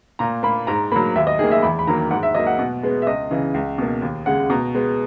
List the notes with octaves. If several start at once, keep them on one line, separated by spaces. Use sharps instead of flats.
A#2 A#5
A#3 B5
G#2 A#5
F#3 A#3 B5
D#2 E5
D#5
D#3 A#3 G#4
E5
E2 B5
B5
D#3 F#3 A#3 A#5
G#2 F#5
E5
F#3 A#3 D#5
F#5
B2
G#3 B3
E5
C#2 D#5
C#3 E3
C#2
B2 A#3
D#2
C#3 G#3 F#5
B2 A#5
G#3 B3